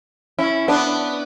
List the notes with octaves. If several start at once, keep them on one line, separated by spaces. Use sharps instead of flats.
C#4 E4
B3 D4